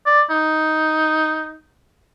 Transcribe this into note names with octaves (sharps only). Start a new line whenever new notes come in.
D5
D#4